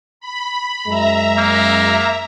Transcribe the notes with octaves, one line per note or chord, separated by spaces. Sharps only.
B5
F#2 G#3 E5 A#5
A#3